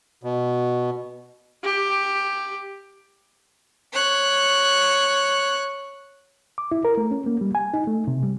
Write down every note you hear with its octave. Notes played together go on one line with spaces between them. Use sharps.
B2
G4
C#5 F#6
D6
E4
A#4
A3
C#4
A#3
G3
G#5
D#4
A3
C3
G3